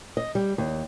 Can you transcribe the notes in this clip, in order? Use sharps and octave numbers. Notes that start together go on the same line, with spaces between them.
D#5
G3
D#2